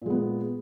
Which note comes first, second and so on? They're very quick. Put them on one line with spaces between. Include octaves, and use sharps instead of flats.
A#2 G#3 B3